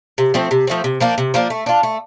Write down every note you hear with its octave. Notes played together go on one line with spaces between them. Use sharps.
C3
F3 A3 C4
C3
F3 A3 C4
C3
F3 A#3 D4
C3
F3 A#3 D4
A3
D4 F4
A3